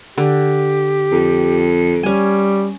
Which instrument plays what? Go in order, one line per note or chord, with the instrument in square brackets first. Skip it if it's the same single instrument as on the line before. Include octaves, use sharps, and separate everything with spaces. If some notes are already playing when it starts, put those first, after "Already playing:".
[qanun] D3 [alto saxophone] G4
[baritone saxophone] F2
[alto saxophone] G3 [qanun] C#4 G#5